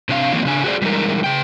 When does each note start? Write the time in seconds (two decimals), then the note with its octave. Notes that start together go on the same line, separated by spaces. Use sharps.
0.09 C3 D4 F5
0.32 D#3 E3 F#3 A#3 C4
0.45 C#3 D4 G#5
0.64 F#4 G#4 C5 D5
0.82 E3 G3 G#3 D#4 A#4
1.24 C#3 G5